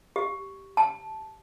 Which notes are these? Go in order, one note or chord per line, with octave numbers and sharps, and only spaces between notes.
G4
A5